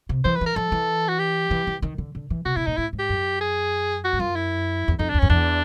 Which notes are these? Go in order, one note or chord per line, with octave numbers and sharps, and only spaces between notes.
C3
E3 C5
B4
E3
A#4
F3 A4
E3
F#4
G4
E3
E3
D#3
D3
D3
E3
C3 F#4
B2 E4
A#2 D#4
A2 E4
G#2
G4
F#2
G#4
F#4
G2
F#2 F4
E4
E2
F2 D#4
D4
E2
F2 C#4
E2 D4